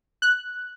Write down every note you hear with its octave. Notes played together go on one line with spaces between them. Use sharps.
F#6